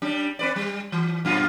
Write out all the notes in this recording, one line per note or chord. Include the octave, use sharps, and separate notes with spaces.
G3 C#4 D4
C4 B4 D5
G3
E3
F#2 A#2 F4